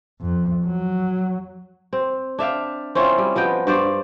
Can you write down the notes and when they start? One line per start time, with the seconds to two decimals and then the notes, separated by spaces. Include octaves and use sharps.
0.21 F2
0.66 F#3
1.93 C4
2.38 D4 E5 F5 G5
2.95 C4 C#4 E4 F4
3.18 G3
3.35 F3 B3 D#5 G5
3.67 G2 C5 D5